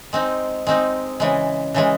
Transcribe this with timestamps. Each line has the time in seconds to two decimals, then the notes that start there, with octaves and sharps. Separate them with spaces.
0.13 G#3 C4 D#4
0.67 G#3 C4 D#4
1.20 C#3 E3 G#3
1.74 C#3 E3 G#3